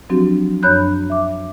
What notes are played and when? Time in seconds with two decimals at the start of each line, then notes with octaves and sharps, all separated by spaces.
0.10 F3 F#3 C4 D4 F#4 G4
0.63 F#2 D4 C#5 B5 F#6 G6
1.10 E5 D6